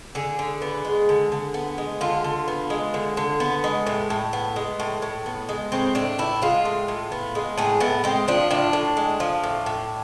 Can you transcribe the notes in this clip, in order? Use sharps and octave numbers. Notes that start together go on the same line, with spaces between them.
D3 G#4
D3
B3
G#3
D3
D3
B3
G#3
D3 F4
D3
B3
G#3
D3
D3
B3
G#3
A2
A2
B3
G#3
A2
A2
B3
G#3
A2 C4
A2 D4
B3 E4
G#3 F4
A2
A2
B3
G#3
A2 G#4
A2 B3
G#3 C4
F3 D4
A2 D4
A2
G#3
F3
A2
A2